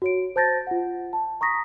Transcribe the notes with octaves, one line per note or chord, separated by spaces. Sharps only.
F#4 C#5 D7
C5 A5 G6 A6 A#6
F4 F#5
A5
A#5 C#6 D#6 A#6 B6